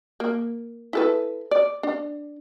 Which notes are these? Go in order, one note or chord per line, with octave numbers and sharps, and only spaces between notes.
A#3
E4 A4 B4
D5
D4